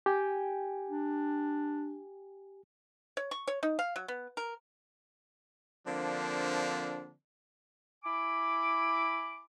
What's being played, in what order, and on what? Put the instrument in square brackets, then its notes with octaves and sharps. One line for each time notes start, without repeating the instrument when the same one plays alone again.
[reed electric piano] G4 G5 G#5
[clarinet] D4
[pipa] C#5
C#6
C#5
D#4
F5
F#3
B3
A#4
[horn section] D3 F3 A#3 C4 D4
[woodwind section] E4 G#5 B5 D6